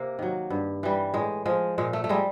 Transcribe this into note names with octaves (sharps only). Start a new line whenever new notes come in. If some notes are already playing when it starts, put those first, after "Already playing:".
Already playing: C3 A#3
D#3 F#3
G2
E3 G3
A2 G#3
F3 G#3
A#2 G#3
A3
A3
G3 G#3